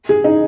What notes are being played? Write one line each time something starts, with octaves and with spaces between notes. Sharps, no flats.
G#4
D#4